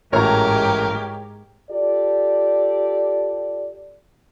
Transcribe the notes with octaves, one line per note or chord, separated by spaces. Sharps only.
A1 G#2 A3 F#4 G4 A#4 C#5 A#5
F4 G4 A4 D5